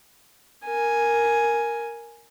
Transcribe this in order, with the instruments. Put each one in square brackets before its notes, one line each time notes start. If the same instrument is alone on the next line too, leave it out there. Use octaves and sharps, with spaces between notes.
[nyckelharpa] A#4 G#5